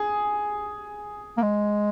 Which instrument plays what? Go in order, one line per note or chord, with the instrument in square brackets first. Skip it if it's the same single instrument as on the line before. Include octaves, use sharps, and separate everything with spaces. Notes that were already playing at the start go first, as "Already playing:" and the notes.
Already playing: [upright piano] G#4
[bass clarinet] A#3
G#3